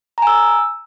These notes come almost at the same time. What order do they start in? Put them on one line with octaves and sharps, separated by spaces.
A#5 G#5 E6